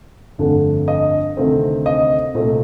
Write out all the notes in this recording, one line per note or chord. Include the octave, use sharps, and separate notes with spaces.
G1 F2 D3 A3 D4
D#5
D2 C3 D#3 A3 C4
D#5
C2 A#2 A3 C4